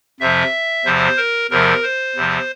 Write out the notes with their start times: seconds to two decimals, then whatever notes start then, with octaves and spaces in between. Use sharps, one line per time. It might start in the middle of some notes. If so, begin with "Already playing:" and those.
0.20 F2 C3 F3 E5
0.85 E2 C3 F3 C5
1.17 A#4
1.50 E2 C3 F3 A#4
1.83 C5
2.15 E2 C3 F3